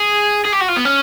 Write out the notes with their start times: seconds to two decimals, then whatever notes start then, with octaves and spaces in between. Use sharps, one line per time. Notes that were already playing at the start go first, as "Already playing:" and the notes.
Already playing: G#4
0.44 G#4
0.52 G4
0.60 F#4
0.68 F4
0.76 B3
0.85 C#4